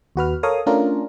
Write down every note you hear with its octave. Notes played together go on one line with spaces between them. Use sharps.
D#2 F#4 B4 F6
A4 A#4 C#5 F5 D#6
A3 C#4 D4 F4 A#4